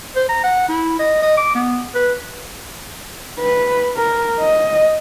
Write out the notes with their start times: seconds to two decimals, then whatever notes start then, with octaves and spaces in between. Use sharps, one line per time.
0.16 C5
0.29 A#5
0.44 F#5
0.69 E4
0.99 D#5
1.22 D#5
1.37 D6
1.55 B3
1.95 B4
3.40 B4
3.96 A#4
4.40 D#5